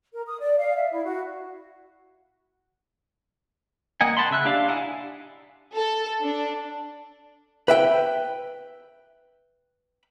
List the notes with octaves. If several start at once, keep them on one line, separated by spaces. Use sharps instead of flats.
A#4
D#6
D5
F5
E5
E4
F#4
A#3 D#5 F#5 G#5
F#5 A5 B5 C6
C#3 E5 F#6
D4 G4 D5 F5
D#4 E4 F#5 G#5
A4
D4
B4 E5 G5